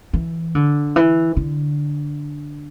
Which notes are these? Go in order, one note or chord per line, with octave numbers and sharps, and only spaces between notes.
E3
D3
E3
D3